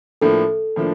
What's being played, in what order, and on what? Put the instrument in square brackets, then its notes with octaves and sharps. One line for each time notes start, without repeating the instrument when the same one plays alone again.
[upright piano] A2 F3 A#3 D4 [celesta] A4
[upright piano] A2 F3 A#3 D4